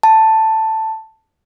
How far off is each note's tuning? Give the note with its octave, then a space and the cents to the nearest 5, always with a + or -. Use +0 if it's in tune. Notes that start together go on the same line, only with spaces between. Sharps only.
A5 +5